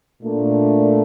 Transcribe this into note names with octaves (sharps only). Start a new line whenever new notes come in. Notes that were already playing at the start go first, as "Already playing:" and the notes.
A#2 A3 D4